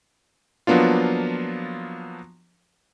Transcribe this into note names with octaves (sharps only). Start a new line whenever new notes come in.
F3 F#3 A#3 B3 D4 F4